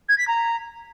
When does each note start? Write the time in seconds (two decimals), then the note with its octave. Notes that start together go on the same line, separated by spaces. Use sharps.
0.09 G#6
0.18 B6
0.28 A#5